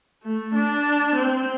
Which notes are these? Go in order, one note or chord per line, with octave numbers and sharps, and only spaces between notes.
A3
D4
C4